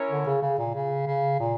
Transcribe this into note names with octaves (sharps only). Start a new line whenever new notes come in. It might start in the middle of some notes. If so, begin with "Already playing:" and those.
Already playing: C#4 E4 A#4 C#5
D3
C#3
C#3
A#2
C#3
C#3
A#2